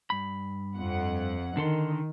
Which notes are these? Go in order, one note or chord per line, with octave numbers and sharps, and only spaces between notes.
G2 B5
F2 F#5
D3 D#3 A4 C6